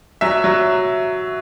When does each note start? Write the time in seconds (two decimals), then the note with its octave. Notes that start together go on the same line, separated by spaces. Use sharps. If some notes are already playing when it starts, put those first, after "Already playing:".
0.21 F#3 E5
0.44 F#3